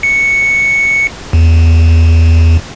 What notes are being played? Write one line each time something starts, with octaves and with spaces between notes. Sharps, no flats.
C#7
E2